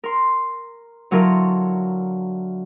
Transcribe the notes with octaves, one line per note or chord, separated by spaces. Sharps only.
A#4 C6
D3 F#3 E4 F4 A#4